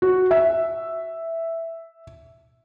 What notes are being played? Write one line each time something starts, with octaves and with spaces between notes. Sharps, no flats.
F#4
E5